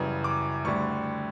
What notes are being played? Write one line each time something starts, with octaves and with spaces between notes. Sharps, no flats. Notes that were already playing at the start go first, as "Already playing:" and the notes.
Already playing: F#2 C#3 E3 G3
D6
D2 D3 G3 C#6